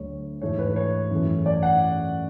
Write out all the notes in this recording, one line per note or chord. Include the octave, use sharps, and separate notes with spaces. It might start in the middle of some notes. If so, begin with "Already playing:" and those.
Already playing: D2 D3 F#3 A3 D4 C#5
G#2 E3 A3 E4 C#5
B4
C#5
F#2 E3 A3
D5
F#5